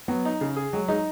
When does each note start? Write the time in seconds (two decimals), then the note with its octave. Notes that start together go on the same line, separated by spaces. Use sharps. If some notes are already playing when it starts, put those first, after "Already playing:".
0.08 F#3 B3
0.25 D#4
0.41 C#3
0.56 G#4
0.73 F#3 G#3
0.88 G#3 D#4